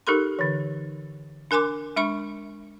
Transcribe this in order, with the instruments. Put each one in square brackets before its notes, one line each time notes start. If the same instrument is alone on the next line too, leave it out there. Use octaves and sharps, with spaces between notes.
[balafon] D#4 G4 A4 A#4 B5 C6
D3 E3
D4 A#4 G#5 C6 D6
G#3 D4 E5 B5 C#6